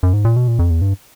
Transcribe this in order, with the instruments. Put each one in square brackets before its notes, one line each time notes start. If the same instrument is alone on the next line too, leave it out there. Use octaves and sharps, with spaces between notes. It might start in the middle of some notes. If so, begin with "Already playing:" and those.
[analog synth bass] F#2
G#2
A#2
B2
A#2
F2
E2
G2